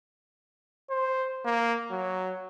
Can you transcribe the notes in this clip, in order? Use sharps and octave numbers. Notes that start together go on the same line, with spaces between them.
C5
A#3
F#3